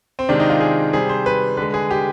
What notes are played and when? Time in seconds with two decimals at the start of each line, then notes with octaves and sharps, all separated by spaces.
0.19 C4
0.29 C3 D#3 G#3 D4
0.39 D#4
0.50 F4
0.60 G#4
0.93 C3 G3 G#4
1.09 C5
1.26 B4
1.57 D3 G#3 B4
1.74 G#4
1.91 G4